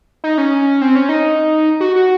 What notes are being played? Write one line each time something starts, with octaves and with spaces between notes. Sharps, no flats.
D#4
C#4
C4
C#4
D#4
F#4
F#4